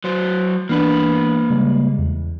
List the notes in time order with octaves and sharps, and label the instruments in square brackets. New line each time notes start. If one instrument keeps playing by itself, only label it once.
[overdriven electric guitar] F#3 C5
[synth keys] E3 B3 D4 [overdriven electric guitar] A#3 B4
[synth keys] C#3 G3 G#3
E2